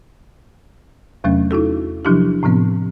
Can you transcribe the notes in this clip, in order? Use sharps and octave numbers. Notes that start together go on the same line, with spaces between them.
E2 C3 F#3 A3 C#4
D#4 E4 F#4 A4
C3 F3 F#3 D4 E4 G4
A2 C3 F3 B3 C4